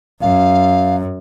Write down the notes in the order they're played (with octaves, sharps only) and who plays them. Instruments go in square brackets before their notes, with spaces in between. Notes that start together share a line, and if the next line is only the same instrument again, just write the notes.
[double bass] F#2 [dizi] F5